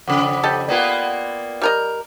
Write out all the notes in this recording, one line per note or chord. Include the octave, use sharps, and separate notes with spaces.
F2 C#3 F#5 D6 D#6
G4 A4 D#5
A#3 B3 F4 D5 G5 G#6
G3 A#4 D#5